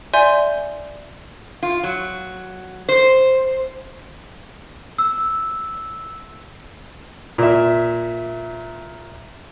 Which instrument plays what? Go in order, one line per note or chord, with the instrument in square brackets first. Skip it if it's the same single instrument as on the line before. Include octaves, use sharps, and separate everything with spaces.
[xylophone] D5 E5 G#5 C6 G6
[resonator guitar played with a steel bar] F4
F#3
C5
[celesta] E6
[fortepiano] A#2 E5